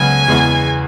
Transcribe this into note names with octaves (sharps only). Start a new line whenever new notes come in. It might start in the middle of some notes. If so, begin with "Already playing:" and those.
Already playing: C#2 C#3 F#3 B3 F#4 G#5
E2 C#3 G#3 B3 E4